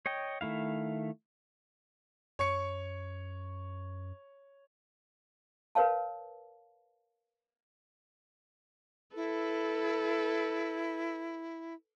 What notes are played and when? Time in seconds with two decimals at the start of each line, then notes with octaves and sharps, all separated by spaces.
0.06 C#5 D#5 G5
0.41 D#3 A3 E4 F5
2.39 F#2 C#5 C#6 C#7
5.75 A#4 B4 C#5 F5 A5
9.16 E4 A4 B4